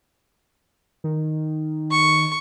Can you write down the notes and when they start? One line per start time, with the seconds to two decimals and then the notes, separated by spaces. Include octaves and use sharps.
1.04 D#3
1.91 C#6